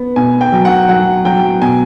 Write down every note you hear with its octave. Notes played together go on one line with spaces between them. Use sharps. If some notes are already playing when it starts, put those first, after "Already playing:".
Already playing: B3
B2 G#5
G5
F#3
F#5
F#3 F#5
F#3 G5
B2 G#5